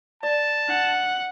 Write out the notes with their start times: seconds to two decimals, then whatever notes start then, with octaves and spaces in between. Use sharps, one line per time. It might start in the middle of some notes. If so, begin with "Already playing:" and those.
0.23 D5 A5
0.69 D4 F#5